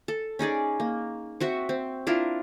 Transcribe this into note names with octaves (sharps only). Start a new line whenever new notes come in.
A4
C#4 D#4 G#4 D5
A#3
C4 F#4 E5 C#6
C4
D4 E4 F4 A#4